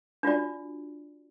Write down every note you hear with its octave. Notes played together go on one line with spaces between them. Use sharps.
D4 F4 F#4 D5